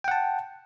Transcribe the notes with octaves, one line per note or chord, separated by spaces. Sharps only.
F#5 G5 A5